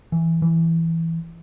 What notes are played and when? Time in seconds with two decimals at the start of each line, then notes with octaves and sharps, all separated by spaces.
0.12 E3
0.42 E3